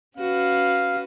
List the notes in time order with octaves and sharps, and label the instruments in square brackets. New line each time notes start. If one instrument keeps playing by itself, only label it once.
[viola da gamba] C#4 F#4 B4 [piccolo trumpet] F5